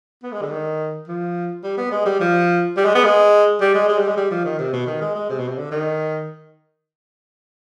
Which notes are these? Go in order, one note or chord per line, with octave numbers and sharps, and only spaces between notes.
B3
G#3
D3
D#3
F3
G3
B3
G#3
G3
F3
G3
G#3
B3
G#3
G3
G#3
G#3
G3
G#3
G3
F3
D#3
C3
B2
D#3
G#3
G#3
C3
B2
C3
D3
D#3